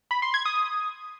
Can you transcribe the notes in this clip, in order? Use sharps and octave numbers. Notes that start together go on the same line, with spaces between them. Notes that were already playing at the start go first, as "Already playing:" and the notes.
B5
C6
G#6
D#6